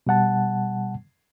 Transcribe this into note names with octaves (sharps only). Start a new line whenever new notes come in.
B2 G3 F#5 A5